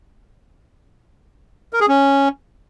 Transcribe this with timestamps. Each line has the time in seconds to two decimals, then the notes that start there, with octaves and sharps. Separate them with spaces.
1.73 A#4
1.81 G#4
1.88 C#4